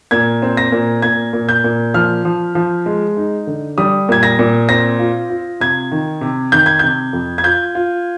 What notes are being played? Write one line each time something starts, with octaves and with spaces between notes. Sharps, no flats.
A#2 G#6
C4
A#6
A#2
A#2 G#6
A#2
G6
A#2
F3 F6
F3
F3
G#3
D#4
D3
G3 D#6
A#2 G#6
A#6
A#2
C4 A#6
F4
F4
C3 G#6
D#3
C3
D#3 G6
G#6
C3 G6
F2
G#6
F4 G6
F4